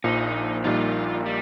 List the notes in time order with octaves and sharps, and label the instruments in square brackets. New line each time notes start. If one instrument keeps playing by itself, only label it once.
[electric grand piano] A#1 A#2 F3 [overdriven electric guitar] D#4
[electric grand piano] A#1 A#2 G3 A#3 D#4 [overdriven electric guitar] F4
[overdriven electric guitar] G3